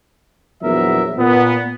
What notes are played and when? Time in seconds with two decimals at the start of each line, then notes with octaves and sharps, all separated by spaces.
0.63 A#1 E2 F#3 B3 A#4 E5
1.18 A#2 B3